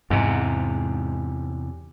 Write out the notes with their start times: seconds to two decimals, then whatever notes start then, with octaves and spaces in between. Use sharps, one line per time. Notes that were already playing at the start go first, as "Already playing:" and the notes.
0.10 E2 G#2 C3